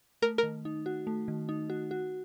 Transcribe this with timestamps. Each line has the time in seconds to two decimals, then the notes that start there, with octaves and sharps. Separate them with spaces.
0.22 A3 A#4
0.38 D#3 A#4
0.65 D#4
0.86 F#4
1.07 A3
1.28 D#3
1.49 D#4
1.70 F#4
1.91 F#4